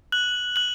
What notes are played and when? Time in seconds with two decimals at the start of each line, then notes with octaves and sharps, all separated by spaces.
0.12 F#6 F#7
0.56 F#6 F#7